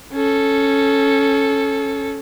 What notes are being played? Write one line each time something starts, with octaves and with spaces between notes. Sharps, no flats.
C#4 A4